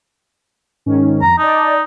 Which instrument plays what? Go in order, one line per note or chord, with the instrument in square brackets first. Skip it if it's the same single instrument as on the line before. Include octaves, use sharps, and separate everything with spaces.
[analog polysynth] G#2 D#3 C#4
[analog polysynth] F2 [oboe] A#5
[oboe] D#4 [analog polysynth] D5 D#5 A5